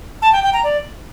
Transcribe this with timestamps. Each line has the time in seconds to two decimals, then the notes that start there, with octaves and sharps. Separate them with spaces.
0.22 A5
0.32 G5
0.43 G5
0.53 A#5
0.64 D5